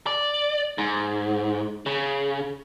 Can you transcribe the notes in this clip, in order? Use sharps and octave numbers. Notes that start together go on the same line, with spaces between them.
D5
G#2
C#3